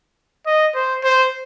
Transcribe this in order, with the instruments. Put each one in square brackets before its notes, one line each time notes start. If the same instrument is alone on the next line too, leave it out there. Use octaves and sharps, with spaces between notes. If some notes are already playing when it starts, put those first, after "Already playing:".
[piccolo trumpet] D#5
C5
C5